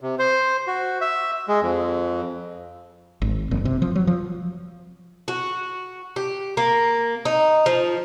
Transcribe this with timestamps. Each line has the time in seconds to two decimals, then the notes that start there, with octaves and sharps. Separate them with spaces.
0.01 C3
0.19 C5
0.67 F#4
1.01 E5
1.48 G#3
1.62 F2
3.22 G#1
3.51 F#1
3.65 C3
3.82 F3
3.95 F#3
4.07 F3
5.28 F#4
6.16 G4
6.57 A#3
7.25 D#4
7.66 F3